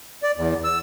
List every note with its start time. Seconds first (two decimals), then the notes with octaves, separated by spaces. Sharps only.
0.23 D5
0.36 E2
0.64 E6